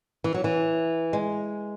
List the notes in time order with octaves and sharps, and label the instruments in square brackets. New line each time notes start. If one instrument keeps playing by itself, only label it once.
[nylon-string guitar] E3
F#3
E3
G#3